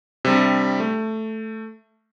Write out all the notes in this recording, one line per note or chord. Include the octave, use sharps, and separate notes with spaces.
C3 G3 D4
A3